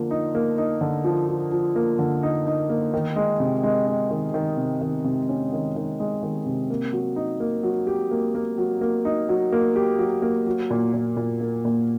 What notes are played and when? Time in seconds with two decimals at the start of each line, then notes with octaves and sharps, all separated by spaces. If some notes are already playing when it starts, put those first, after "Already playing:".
Already playing: D3 F3 A#3
0.11 D#4
0.35 A#3
0.58 D#4
0.81 D3
1.04 F3
1.28 F3
1.52 F3
1.76 A#3
1.99 D3
2.23 D#4
2.46 D#4
2.70 A#3
2.94 D#3
3.16 G#3
3.40 C3
3.63 G#3
3.87 G#3
4.10 D#3
4.34 D#3
4.57 C3
4.81 D#3
5.04 C3
5.29 C#4
5.53 D#3
5.76 D#3
6.00 G#3
6.23 D#3
6.46 C3
6.70 A#3
6.93 F#3
7.16 D#4
7.40 A#3
7.63 F#3
7.87 G4
8.11 A#3
8.35 A#3
8.58 F#3
8.81 A#3
9.05 D#4
9.29 F#3
9.52 A#3
9.76 G4
9.99 F#3
10.22 A#3
10.47 F#3
10.70 A#2
10.93 A#2
11.17 A#2
11.41 A#3
11.65 A#2